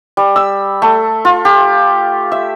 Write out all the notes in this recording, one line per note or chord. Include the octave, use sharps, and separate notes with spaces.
G3
E6
A3
F4
G4
E5